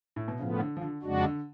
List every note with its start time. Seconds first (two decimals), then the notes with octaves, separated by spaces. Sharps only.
0.16 A2
0.28 B2
0.39 A2 C#3 F3 B3
0.60 D3
0.77 F3
0.81 D3
1.02 F2 C#3 G#3 D4 F#4
1.24 D3